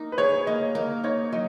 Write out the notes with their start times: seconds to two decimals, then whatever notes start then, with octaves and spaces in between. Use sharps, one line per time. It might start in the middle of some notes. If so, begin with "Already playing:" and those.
Already playing: A#3 D#4
0.12 B4
0.18 G#4 C#5
0.47 A#3 D#5
0.75 A#3 D#5
1.04 D#4 C#5
1.32 F#3 D#5